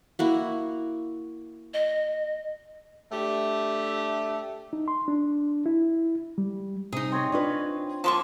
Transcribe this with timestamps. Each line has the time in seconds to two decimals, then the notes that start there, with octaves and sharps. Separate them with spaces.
0.19 A#3 E4 F#4
1.74 D#5
3.12 A3 D4 G4 E5
4.73 D#4
4.88 C6
5.08 D4
5.66 E4
6.38 G3
6.92 C3 D#4 G#4
7.12 C4 C#5 C#6
7.32 D4 F4 B4
8.04 F3 A#3 A5 C6 C#6